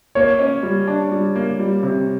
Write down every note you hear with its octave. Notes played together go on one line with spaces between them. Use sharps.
A#3 C#5
C#4
G3
D4
G3
A#3
G3
C3